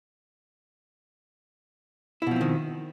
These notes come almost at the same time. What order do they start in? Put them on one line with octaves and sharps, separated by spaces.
E4 B2 F3 C4 D#3